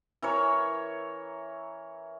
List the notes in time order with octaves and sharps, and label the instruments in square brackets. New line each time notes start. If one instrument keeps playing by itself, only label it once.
[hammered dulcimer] E3 A#4 C#5